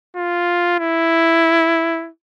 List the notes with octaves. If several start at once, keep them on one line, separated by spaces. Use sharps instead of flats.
F4
E4